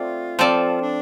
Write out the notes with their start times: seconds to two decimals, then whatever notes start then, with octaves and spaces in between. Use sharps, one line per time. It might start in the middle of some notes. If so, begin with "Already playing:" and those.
Already playing: A3 C4 F4 D5
0.39 F3 C4 A4 D5
0.81 D4